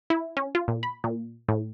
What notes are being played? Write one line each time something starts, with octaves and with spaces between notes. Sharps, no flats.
E4
C#4
F4
A#2
B5
A#2
A2